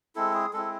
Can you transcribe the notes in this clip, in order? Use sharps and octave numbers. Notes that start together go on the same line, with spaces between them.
G#3 C4 E4 A4
G#4
G#3 C4 E4 A4